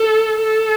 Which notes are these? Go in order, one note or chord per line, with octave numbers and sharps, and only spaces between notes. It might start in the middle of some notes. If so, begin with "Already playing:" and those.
Already playing: A4
A4